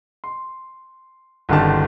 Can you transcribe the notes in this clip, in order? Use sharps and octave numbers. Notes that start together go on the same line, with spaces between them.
C6
G1 C#2 D3 D#3 G4 A5